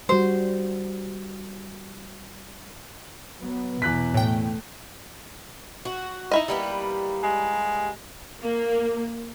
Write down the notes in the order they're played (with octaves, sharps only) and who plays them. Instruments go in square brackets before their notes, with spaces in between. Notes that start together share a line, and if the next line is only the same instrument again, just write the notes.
[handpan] G3 F#4 [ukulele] C5
[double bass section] F#3 B3
[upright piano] E2 F#6 B6 [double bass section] B2
[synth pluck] A2 G5 [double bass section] A3
[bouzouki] F#4
[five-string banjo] D#4 E4 D#5
[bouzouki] G3 A#3 B3
[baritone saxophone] G#3
[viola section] A#3